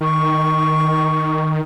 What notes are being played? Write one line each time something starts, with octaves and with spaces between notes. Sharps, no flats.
D#3 C#6